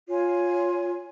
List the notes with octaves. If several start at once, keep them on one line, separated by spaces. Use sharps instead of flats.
F4 C#5 G#5